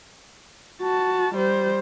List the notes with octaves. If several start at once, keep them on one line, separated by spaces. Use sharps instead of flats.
F#4 A5
G3 C5